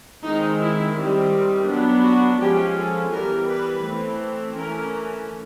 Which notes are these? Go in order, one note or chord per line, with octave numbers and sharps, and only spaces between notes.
D#3 G#3 C4 D#4
E4
D#3 G3 C4
F#3 B3 D4
F#4
F3 G#3 C#4 G4
A4
E3 G3 B3 A#4
B4
E3 A3 C4
E3 A3 C#4 A#4